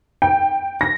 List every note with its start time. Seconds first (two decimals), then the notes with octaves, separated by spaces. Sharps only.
0.22 G5
0.81 A#6